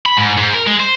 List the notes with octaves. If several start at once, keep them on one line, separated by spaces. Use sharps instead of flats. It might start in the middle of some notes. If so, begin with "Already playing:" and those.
B5
G#2
G#2
A#4
G#3
C5